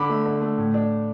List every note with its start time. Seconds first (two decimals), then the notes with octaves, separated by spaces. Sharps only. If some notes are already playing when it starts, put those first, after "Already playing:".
Already playing: D3 B5 D6
0.09 A3
0.26 D3
0.41 A3
0.58 A2
0.74 D4